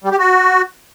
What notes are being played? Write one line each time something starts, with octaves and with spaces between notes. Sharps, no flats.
G3
G4
F#4